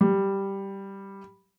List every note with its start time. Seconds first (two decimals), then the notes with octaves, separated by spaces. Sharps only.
0.01 G3